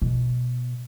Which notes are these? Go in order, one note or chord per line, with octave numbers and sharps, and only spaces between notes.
B2